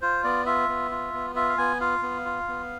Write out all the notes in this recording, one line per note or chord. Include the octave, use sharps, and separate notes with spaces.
F4 C5
B3 D5
F4 E5
B3
F4
B3
F4 E5
F5
B3 G#5
F4 F5
B3
F4
B3